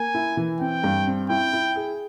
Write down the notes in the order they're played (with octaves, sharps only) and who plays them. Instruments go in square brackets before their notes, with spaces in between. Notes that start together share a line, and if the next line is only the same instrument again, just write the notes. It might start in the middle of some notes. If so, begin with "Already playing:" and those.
Already playing: [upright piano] A#3 [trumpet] G#5
[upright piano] E4
E3
[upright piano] C4 [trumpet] G5
[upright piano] G2
C4
[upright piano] E4 [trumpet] G5
[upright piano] E4
G#4